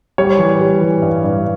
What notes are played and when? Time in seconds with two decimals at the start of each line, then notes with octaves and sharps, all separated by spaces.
0.18 G3 C#5
0.38 E3
0.61 G3
0.81 E3
1.02 G2
1.24 G2